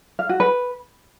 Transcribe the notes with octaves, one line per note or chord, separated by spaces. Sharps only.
F5
F#4
B4